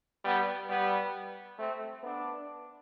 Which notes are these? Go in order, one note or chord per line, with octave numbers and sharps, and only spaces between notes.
G3 B3
G3 B3
A3 C4
B3 D4